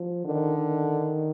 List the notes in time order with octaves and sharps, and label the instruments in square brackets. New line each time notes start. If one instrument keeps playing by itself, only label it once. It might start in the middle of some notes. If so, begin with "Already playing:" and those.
Already playing: [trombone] F3
[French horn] D3 [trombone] D#3
[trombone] D#3